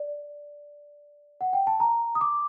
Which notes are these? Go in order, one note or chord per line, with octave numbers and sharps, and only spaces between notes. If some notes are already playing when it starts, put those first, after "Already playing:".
Already playing: D5
F#5
G5
A5
A#5
D#6
D6